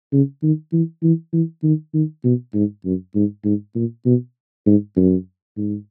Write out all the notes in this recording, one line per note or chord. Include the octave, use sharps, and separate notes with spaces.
C#3
D#3
E3
E3
E3
D#3
D#3
B2
G#2
F#2
G#2
G#2
A#2
B2
G#2
F#2
G#2